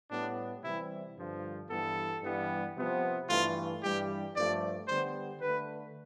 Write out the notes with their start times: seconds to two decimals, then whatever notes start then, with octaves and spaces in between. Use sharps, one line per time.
0.10 A2 G3 B3 D4
0.63 C3 E3 G3 E4
1.17 G2 D3 F3
1.69 G2 E3 B3 A4
2.22 G2 E3 G3 B3
2.76 C3 F3 B3
3.29 G2 E3 A3 F4
3.82 G2 E3 G3 G4
4.35 G2 F3 A3 D5
4.88 D3 G3 B3 C5
5.41 D3 A3 B4